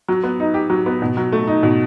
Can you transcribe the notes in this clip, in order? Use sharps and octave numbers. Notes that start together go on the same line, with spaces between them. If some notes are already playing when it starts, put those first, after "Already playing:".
F#3
B3
D#4
G4
F#3
B3
B2
F#3
A3
D#4
B2